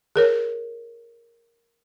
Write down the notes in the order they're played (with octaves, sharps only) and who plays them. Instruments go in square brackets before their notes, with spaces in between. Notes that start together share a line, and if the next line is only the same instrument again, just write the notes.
[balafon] G#4 A#4 C#5